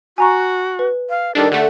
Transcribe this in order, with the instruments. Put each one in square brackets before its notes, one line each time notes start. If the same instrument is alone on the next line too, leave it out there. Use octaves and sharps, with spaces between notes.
[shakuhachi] F#4 [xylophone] G#5 A#5 C#6
[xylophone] B4
[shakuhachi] F5
[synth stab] D#3 G3 D4 [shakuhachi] A4
[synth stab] D3 A3 [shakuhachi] F#5